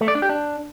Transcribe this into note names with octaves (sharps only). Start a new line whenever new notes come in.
A3
D5
D4
G4
D4